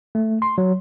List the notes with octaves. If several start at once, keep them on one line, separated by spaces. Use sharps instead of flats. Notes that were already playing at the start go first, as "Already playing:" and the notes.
A3
C6
F#3